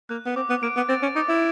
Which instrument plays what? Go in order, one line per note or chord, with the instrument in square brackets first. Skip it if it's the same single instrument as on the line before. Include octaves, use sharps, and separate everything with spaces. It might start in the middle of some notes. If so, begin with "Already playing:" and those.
[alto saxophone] A#3 [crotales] F#6
[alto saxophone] B3
[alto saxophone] C4 [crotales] D6
[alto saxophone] B3
[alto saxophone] A#3 [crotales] D7
[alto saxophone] B3
[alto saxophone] C4 [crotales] A6
[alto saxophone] C#4
[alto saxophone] D#4 [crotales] D6
[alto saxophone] E4